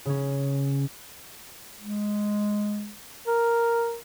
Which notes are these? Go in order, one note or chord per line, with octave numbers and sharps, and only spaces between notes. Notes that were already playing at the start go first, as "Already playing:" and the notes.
C#3 C#4
G#3
A#4